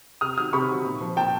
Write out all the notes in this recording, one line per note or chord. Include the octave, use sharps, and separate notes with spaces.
C3 D#6 F6
D#3 F#3 D#6 F6
C3 B5 C#6
D#3 F#3
A#2
F3
A#2 G5 A5